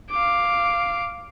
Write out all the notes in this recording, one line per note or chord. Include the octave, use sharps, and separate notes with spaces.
F5 D6